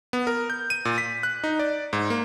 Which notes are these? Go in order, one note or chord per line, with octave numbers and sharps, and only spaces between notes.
B3
A#4
G6
D#7
A#2
B6
F#6
D#4
D5
G#2
A#3